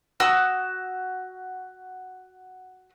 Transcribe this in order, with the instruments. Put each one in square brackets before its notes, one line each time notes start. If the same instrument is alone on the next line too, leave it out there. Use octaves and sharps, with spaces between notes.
[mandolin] F#4 D#6 E6